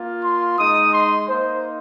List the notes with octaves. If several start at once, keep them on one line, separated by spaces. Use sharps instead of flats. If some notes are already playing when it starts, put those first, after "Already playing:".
Already playing: A#3 F4
C6
G#3 D#4 D#6
C6
A#3 D#4 C5